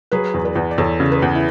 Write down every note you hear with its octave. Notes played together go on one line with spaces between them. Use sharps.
F#3 G#4 B4
E2
B4 D5
E2
D5
E2 A4 C#5
C#3
G#4 B4
E2
E4